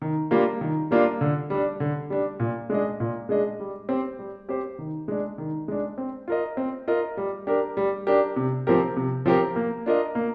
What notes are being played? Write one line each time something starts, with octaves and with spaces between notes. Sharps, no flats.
D#3
G3 A#3 D4 F4
D#3
G3 A#3 D4 F4
D3
G3 D4
D3
G3 D4
A#2
G#3 D4 G#4 D#5
A#2
G#3 D4 G#4 D#5
G3
C4 G4 C5
G3
C4 G4 C5
D#3
G#3 D4
D#3
G#3 D4
C4
F4 A#4 D#5
C4
F4 A#4 D#5
G3
D4 G4 A#4
G3
D4 G4 A#4
C3
F3 C4 G4 A#4
C3
F3 C4 G4 A#4
A#3
D4 F4 A#4 D#5
A#3